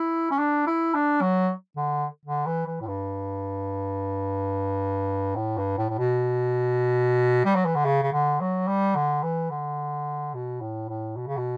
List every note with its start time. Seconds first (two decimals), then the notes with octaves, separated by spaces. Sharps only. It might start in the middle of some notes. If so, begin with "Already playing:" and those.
Already playing: E4
0.31 C#4
0.39 D4
0.67 E4
0.94 D4
1.21 F#3
1.77 D3
2.26 D3
2.46 E3
2.67 E3
2.81 A2
2.87 G2
5.36 A2
5.58 G2
5.78 A2
5.89 A2
5.98 B2
7.45 G3
7.55 F#3
7.66 E3
7.75 D3
7.85 C#3
8.03 C#3
8.13 D3
8.40 F#3
8.68 G3
8.95 D3
9.23 E3
9.51 D3
10.34 B2
10.61 A2
10.89 A2
11.17 B2
11.27 C#3
11.37 B2